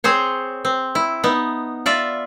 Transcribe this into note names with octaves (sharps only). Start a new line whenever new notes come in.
C4 G#4 C5 C#5
C4
E4
B3 D#4
F4 D5 E5